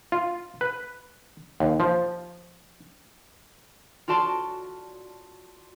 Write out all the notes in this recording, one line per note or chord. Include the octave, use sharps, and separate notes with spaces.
F4
B4
D#2
F3
F4 F#4 D5 A5 C6